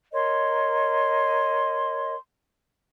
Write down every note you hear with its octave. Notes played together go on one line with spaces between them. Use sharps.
A#4 C#5 D#5 C6